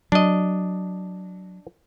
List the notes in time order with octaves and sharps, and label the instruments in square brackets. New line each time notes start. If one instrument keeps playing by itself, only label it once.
[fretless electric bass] F#3 [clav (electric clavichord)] D4 D#5